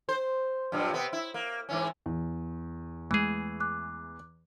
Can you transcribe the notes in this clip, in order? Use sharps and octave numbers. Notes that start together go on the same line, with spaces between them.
C5
G2 A#2 F#3
C3 B3
E4
A#3
G#2 E3 C#4
E2
E3 G#3 A3 G#4
D6 F#6